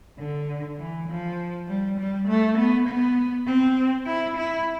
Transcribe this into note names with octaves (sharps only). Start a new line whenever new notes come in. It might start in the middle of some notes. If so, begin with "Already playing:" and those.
D3
E3
F3
G3
G3
A3
B3
B3
C4
E4
E4